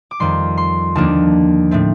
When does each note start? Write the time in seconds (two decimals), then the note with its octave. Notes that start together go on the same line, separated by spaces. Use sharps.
0.11 D6
0.20 F2 D#3 G3 C6
0.57 C6
0.95 D#2 D3 F3 A#3 D4 A5
1.71 A2 A3 C4